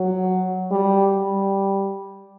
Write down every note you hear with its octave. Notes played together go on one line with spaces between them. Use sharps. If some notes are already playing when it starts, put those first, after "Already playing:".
Already playing: F#3
G3
G3